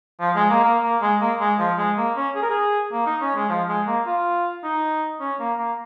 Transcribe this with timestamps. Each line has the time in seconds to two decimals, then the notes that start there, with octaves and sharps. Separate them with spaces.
0.20 F3
0.35 G#3
0.50 A#3
0.64 A#3
0.83 A#3
1.01 G#3
1.21 A#3
1.40 G#3
1.59 F3
1.78 G#3
1.98 A#3
2.16 C#4
2.35 G#4
2.42 A#4
2.50 G#4
2.92 A#3
3.06 D#4
3.21 C#4
3.35 G#3
3.49 F3
3.68 G#3
3.87 A#3
4.06 F4
4.64 D#4
5.20 C#4
5.39 A#3
5.58 A#3